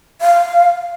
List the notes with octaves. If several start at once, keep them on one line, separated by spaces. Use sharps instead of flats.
F5